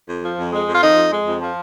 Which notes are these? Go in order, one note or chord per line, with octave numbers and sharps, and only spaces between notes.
F2
F3
F2
G#3
F2
F4
F3 D#4
F2
G#3
F2
F3